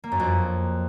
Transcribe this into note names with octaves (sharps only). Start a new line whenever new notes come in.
A#3
F#2
F2